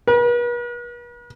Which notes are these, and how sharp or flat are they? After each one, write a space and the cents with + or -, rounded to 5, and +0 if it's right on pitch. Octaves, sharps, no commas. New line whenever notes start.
B4 -45